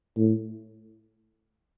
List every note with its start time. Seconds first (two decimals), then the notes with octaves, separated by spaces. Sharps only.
0.18 A2